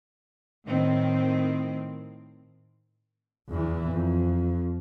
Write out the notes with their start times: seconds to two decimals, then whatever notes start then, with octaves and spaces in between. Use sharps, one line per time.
0.65 A2 D#3 C4
3.49 E2 E3
3.89 F2